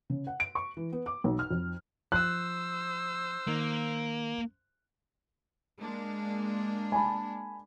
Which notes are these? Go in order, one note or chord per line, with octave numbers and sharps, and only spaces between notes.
C#3
F#5
D7
C#6
E3
B3
D6
B1
F6
F2
F3 C5 E6 F#6
D#3 A#3
G#3 A#3 D4
G#5 A5 B5